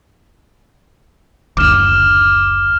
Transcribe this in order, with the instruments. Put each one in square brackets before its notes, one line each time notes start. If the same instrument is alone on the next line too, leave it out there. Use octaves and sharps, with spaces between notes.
[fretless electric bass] F#1 D2 [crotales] D6 F6 E7